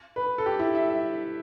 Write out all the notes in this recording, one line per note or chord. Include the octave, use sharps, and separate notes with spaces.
B4
A4
G4
E4
E5
E5